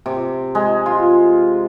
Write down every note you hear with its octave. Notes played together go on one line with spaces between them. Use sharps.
C3
G#3
F4